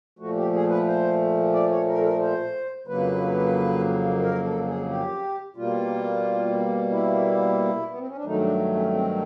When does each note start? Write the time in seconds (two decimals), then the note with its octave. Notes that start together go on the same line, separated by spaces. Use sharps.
0.19 A#2 F3 A3 F#4
0.36 G4
0.53 G#4
0.69 B4
0.86 C5
1.53 D5
1.70 C#5
1.87 A#4
1.98 A4
2.03 A#4
2.20 C5
2.87 F2 C#3 F#3 A#3 B4
4.22 A#4
4.44 A4
4.62 A4
4.66 G#4
4.89 G4
5.56 B2 G3 A#3 F4
6.90 E4
7.90 B3
7.99 C4
8.08 C#4
8.16 D4
8.25 G2 D#3 F#3 A3 D#4
8.41 D4
8.75 C#4
8.92 C4